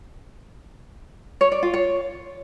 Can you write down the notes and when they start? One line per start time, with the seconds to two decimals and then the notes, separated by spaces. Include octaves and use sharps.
1.41 C#5
1.52 D5
1.63 F4
1.74 C#5